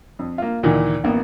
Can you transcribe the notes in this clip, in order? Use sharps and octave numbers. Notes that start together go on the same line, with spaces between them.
F2
A#3 F4
D2 A#2 D#3 E3
A1 A#3 B3